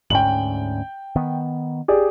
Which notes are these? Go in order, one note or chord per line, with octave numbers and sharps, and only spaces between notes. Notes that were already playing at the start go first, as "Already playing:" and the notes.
D2 G#2 C#4 G5 F#7
D#3 B3
G4 G#4 D5